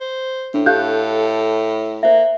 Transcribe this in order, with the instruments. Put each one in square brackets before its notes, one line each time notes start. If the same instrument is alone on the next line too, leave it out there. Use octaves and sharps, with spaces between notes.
[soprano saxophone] C5
[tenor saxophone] A2 [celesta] D4
[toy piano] G4 [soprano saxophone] A4 [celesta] F5 F#6 G6
[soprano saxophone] A#3 [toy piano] C5 E5